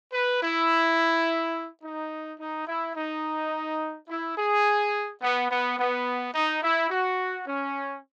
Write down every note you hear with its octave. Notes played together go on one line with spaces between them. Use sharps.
B4
E4
D#4
D#4
E4
D#4
E4
G#4
B3
B3
B3
D#4
E4
F#4
C#4